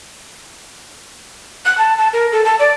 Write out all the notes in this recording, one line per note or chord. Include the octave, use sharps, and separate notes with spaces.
F#6
A5
A5
A#4
A4
A5
D5